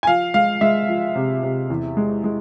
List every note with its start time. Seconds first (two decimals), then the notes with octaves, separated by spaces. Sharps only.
0.03 G#5
0.07 F3 F5
0.34 G#3 F5
0.61 G#3 E5
0.89 F3
1.15 C3
1.43 C3
1.70 E2
1.97 G#3
2.24 G#3